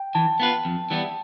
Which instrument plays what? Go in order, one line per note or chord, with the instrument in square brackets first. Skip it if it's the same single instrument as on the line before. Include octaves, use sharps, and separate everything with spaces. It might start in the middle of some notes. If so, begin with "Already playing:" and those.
Already playing: [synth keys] G5
[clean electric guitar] E3 [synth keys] A5
[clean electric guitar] B3 F4 B4
F2
E3 G3 B3 E4